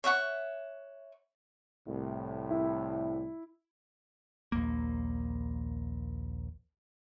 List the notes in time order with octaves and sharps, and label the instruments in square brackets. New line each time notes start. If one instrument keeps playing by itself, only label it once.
[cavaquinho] C#5 E5 F#5 C#6
[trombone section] C2 A2
[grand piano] E4
[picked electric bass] A#1 D#2 A#3